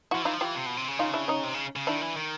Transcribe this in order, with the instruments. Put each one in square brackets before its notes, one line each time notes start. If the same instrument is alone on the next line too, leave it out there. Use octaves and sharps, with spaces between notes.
[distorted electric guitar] F3 [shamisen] E4 F#4
[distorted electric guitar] E3 [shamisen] D#4 F4
[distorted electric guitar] F3
[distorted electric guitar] E3 [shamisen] F4 G4
[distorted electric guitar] C3
B2
C3
C#3
[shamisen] D#4 F4
D4 E4
C#4 D#4
[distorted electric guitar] C3
C#3
C#3
[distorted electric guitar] D#3 [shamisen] D4 E4
[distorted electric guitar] E3
D#3